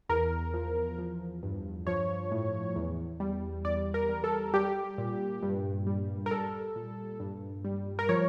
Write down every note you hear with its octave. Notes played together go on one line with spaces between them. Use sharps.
E2 A#4
F3
F3
G2
F3 C#5
A2
E2
G3
E2 D5
A#4
G3
A4
G3 G4
A#2
G2
G3
A#4
G3 A4
A#2
G2
G3
A#4
F3 C#5